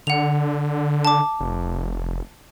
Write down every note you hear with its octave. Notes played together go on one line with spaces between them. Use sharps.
D3 F#5 F7
A5 D6
F1